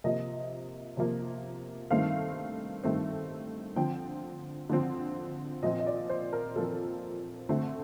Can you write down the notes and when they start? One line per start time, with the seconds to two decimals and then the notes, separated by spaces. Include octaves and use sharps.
0.04 C3 F3 A#3 D#5
0.97 C3 F3 A#3
1.91 G2 D#3 A3 C4 F5
2.83 G2 D#3 A3 C4
3.76 D3 F3 C4 G5
4.70 D3 F3 C4
5.63 A#2 F3 C4 D#5
5.79 D#5
5.86 D5
6.10 C5
6.33 A#4
6.56 A#2 F3 C4 A4
7.49 D3 A3 C4